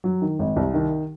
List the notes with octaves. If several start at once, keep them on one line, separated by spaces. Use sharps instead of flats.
F#3
D#3
G#1
C2
D#3